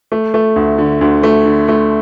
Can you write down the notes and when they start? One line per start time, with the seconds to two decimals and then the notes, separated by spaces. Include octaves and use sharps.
0.12 A3
0.34 A3
0.56 D2
0.78 D3
1.01 D2
1.23 A3
1.46 D3
1.68 A3